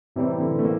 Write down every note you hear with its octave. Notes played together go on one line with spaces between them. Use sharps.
A2 C3 E3 G3 C4
D3
A3
A#3